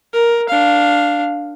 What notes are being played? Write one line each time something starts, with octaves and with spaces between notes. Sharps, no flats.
A#4
D4 F5